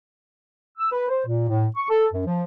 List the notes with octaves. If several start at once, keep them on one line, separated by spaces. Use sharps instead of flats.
E6
B4
C5
A#2
A2
C#6
A4
F#2
F3